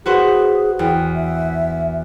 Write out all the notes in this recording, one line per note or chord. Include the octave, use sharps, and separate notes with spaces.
F#4 G#4 B4 C5
E2 G5
E5